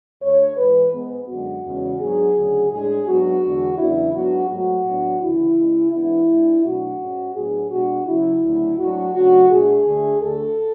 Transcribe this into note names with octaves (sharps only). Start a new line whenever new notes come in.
D2 D3 A3 D4 C#5
G#2 E3 G#3 B4
G#2 G#3 B3
F#2 D3 G#3 F#4
E2 C#3 G#3 C#4
G#2 F#3 B3 D4 G#4
D2 C#3 F#3
A2 G#3 D4 G#4
G#2 F#3 B3 D4 F#4
E2 D3 G#3 D4
E2 C#3 F#3 B3 D4 E4
G#2 F#3 B3 D4 F#4
G#2 F#3 A3 F#4
A2 F#3 B3 D4
D2 C#3 E3 E4
C#3 G#3 C#4
G#2 E3 B3 D4 E4
G#2 G#3 D4
B2 F#3 A3 D4 F#4
G#2 G#3 C#4
A2 F#3 B3 D4 G#4
B2 G#3 B3 D4 F#4
C#3 F#3 C#4 E4
D2 C#3 F#3 A3
G#2 F#3 A3 D4 F#4
C#3 F#3 A3 D4 F#4
B2 A3 D4 G#4
D2 D3 A3 D4
D2 D3 A3 A4